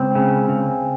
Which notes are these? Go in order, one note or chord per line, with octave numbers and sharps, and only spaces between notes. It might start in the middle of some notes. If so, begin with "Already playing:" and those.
Already playing: C#2 C4
C#3
C#3